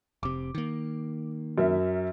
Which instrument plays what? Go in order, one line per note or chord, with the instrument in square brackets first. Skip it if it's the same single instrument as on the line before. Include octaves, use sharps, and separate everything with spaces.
[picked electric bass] F1 C3 [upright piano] D6
[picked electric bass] D#3 A#3
[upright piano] F#2 A#4 E5